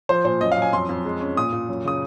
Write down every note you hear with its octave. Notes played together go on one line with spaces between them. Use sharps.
F3 C5
A#2 C5
F#2 D#5
F5
F#2 G#5
F2 C6
F2
G#3
C#4
A#2 D#6
A#2
F#2
C#3 D#6